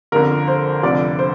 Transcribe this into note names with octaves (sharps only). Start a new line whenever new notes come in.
G1 F2 D3 A#4
C5
F1 F2 D3 F3 D5
C5